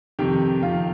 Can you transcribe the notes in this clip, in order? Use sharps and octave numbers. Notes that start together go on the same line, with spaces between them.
F2 C3 D#3 G4
F2 C3 D#3 F4